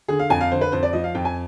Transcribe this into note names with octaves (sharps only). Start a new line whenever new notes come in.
D3 G#4
F5
F2 G#5
F5
D3 C5
B4
F2 C5
D5
F3 D#5
F5
F2 G5
G#5